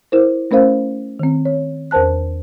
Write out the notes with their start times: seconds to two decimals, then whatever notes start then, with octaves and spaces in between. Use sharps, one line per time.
0.12 E4 A#4 C5
0.51 A3 C#4 A#4 C5 F5
1.19 D#3 C4
1.45 C#5
1.91 E2 A#4 C5 A5 F#6